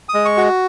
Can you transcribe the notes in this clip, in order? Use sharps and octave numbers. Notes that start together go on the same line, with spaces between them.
D#6
G#3
C#6
F#4